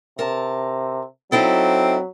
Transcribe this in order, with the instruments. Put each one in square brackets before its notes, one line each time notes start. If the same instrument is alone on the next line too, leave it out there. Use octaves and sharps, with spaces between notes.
[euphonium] C3 [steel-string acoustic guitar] A#4 A5
[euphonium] F#3 [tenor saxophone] C4 [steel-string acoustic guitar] D#4 E4 A4